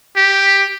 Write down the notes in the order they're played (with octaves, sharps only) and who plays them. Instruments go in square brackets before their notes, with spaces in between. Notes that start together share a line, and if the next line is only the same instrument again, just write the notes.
[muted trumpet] G4